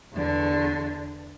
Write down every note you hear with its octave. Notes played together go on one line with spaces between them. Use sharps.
E2 D3